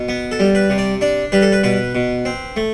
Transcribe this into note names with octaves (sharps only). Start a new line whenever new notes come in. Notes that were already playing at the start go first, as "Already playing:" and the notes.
Already playing: B2
B3
A4
G3
B4
C3
D5
D4 D5
G3 B4
A4
B4
B2 B4
B2
C4
A3